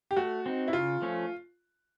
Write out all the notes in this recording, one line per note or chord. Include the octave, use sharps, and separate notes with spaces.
G4
A3 F#4
C4 D#4
E4
C#3 F4
F3 A3 C#4